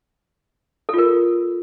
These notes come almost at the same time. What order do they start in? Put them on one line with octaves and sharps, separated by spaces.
A4 F4 A#4